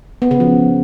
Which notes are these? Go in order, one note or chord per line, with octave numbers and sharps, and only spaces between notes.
B3
C#3
F3